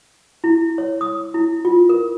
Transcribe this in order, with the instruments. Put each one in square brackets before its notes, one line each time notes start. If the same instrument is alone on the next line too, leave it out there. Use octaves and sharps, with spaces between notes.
[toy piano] E4
C#5
D#6
E4
F4
A#4